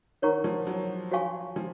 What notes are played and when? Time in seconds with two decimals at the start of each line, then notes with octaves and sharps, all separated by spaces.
0.22 D#3 A#4 C#5 F#5 A#5 C#6
0.44 F3
0.67 F#3
1.12 F#4 C#5 F5 G#5 C#6
1.56 F3